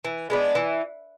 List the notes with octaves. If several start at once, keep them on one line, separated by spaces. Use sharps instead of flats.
E3
G#3 B3 D4
E3